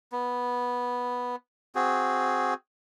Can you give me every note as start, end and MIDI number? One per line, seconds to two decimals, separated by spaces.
0.12 1.36 59
1.75 2.54 60
1.75 2.54 66
1.75 2.54 68